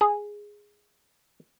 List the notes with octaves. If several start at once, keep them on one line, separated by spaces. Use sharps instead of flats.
G#4